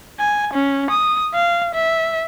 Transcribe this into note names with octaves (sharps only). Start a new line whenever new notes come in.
G#5
C#4
D#6
F5
E5